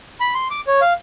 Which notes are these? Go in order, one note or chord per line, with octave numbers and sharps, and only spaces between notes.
B5
C6
D6
C#5
F5